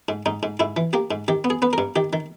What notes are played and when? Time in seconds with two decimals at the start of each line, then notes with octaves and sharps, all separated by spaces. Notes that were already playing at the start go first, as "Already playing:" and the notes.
0.09 G#2
0.26 G#2 D#4
0.43 G#2
0.60 G#2 E4
0.77 E3
0.93 A#3 G4
1.11 G#2
1.28 D#3 G4
1.44 B3
1.50 G#4
1.62 B3 B4
1.73 A#4
1.78 G2
1.96 D#3 G4
2.13 D#3